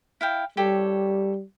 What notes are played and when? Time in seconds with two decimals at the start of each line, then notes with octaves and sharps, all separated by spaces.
0.21 E4 F5 G5
0.57 G3 G4 A4 C#5